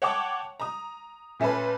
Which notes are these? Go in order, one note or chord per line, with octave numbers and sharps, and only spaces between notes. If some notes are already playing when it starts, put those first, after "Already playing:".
C#5 F#5 G5 A5 C#6 D6
A#5 D#6
A#2 A3 C#4 A4 B4